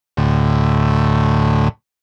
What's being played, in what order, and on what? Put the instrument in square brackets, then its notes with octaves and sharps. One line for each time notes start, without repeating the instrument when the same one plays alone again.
[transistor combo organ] D2 A2